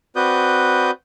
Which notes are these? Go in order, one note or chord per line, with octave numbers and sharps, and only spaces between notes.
C4 F#4 B4 D5 D#6 G6